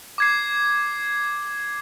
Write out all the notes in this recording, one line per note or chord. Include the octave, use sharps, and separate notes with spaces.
D6 G#6 C7